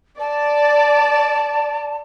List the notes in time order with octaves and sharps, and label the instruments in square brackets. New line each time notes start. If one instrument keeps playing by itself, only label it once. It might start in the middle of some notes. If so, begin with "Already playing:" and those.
[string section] D5 [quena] A5